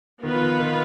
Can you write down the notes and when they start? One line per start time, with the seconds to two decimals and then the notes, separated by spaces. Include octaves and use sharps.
0.23 D#3 B3 F4 B4
0.34 F3
0.41 D#3
0.59 D#3